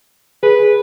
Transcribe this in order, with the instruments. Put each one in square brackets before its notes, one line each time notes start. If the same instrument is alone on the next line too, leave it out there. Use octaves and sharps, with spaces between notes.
[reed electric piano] G#4 [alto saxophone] B4